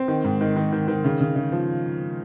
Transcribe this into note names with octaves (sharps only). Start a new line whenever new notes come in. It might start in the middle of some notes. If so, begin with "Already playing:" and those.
Already playing: C4
D#3
G#2
D#3
D#3
D#3
D#3
C#3
C#3
C#3
F3